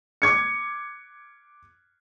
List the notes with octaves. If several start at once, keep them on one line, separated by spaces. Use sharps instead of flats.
D6 G#6 C#7